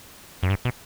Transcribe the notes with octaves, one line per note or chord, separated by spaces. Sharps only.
F#2
G2
B2